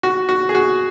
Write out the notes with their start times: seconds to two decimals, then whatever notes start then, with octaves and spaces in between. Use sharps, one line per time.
0.03 F#4
0.29 F#4
0.49 G#4
0.55 F#4